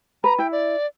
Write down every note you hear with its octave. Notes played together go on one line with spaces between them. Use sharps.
B4 A#5
E4 G5
D5